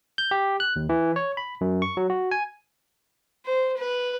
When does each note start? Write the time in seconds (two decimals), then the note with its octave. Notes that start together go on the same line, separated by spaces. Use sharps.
0.18 G6
0.31 G4
0.60 F#6
0.76 D#2
0.89 E3
1.16 C#5
1.37 B5
1.61 F#2
1.82 C#6
1.97 F#3
2.10 F#4
2.31 G#5
3.46 C5
3.78 B4